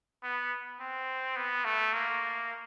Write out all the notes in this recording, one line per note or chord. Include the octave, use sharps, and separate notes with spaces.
B3
C4
B3
A3
A#3